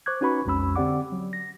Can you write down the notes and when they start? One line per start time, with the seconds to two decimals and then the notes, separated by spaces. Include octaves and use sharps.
0.06 C5 C#6 D6 F#6 G#6
0.21 C#4 D#4 F#4 B4 B5 C#6
0.45 B1 F2 G#3 C#4 B5 E6
0.76 D3 C4 G4 D5 F#5 D6
1.12 F#3
1.33 A#6